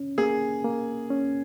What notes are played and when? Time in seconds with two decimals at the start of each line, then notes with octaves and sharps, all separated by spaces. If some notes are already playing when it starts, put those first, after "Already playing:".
Already playing: C#4
0.18 A#3 G#4
0.65 A#3
1.10 C#4